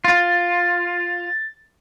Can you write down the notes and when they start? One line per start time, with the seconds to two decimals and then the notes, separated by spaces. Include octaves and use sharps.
0.04 F4 A6